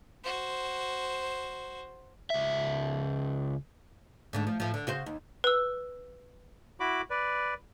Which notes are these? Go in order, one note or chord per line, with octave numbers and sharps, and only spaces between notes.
F#4 C5
C#2 E5
G#2 D3 A3
F3
A2 F3
D3
C#3 F#4 C5
D#2
B4 E6
E4 F#4 B5 D6
B4 D5